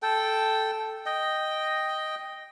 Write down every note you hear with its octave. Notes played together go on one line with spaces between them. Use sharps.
A4 G5
D#5 G5